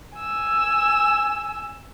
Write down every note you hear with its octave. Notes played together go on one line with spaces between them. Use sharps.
G#5 E6